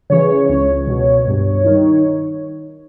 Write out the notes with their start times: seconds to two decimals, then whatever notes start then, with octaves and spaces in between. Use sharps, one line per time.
0.10 C#3 E3 C#5
0.49 C#2
0.87 B2
1.27 G2
1.64 D#3